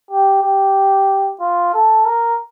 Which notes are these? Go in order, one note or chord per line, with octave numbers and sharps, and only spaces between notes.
G4
G4
F4
A4
A#4